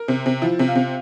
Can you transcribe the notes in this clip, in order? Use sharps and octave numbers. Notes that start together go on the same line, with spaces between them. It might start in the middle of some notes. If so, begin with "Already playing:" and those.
Already playing: A#4
C3
C3
F3 E4
C3
F4
C3